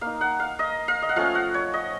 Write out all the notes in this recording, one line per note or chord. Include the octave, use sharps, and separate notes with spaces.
A#3 D#4 F5
F#5
F5
D#5
F5
D#5
F#5
F3 A3 C#4 F5
F#5
C#5
D#5